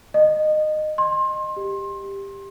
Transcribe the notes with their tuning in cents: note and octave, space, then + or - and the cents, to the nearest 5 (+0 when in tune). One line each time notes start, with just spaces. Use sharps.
D#5 -20
C6 +25
G4 +10